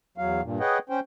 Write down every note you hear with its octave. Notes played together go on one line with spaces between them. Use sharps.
E2 F#3 F5
G2 A#2
G#4 B4 C#5 D#5 F#5 G5
C#4 C5 G5